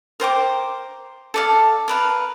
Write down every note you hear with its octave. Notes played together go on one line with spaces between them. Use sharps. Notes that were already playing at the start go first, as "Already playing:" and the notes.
A#4 C5 G5 D6
A4 D5 F5
A#4 B4 F5